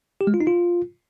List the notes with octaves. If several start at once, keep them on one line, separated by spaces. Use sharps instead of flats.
G4
G#3
F4
D#4
F4